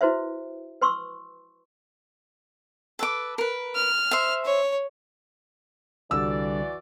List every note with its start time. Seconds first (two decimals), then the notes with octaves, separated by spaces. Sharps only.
0.01 E4 F#4 B4 C5 E5
0.82 B4 C6 C#6 E6
2.99 A4 B4 D6
3.38 A#4 B4
3.75 F6
4.11 C5 E5
4.45 C#5
6.11 C2 D3 E3 G3 F#4 D5 E6